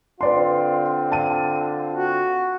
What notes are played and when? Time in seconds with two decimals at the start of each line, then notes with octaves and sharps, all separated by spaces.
0.21 D3 C4 F4 B4 D5 C6
1.12 A5 D#7
1.94 F#4